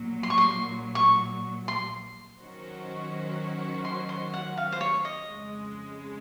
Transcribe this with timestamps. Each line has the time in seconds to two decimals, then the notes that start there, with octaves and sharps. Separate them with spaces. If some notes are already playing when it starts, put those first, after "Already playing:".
Already playing: A#1 A#2 F#3
0.23 C6
0.30 C#6
0.38 C6
0.95 C#6
1.68 C6
2.40 D#3 F#3 C#4 F#4 C5
3.85 C6
4.09 C6
4.34 F#5
4.57 F5
4.72 C5
4.81 C#5
5.05 D#5
5.29 F2 C#3 G#3